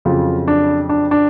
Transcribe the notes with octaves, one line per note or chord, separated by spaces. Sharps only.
F2 C#3 F#3 F4
D4
D4
D4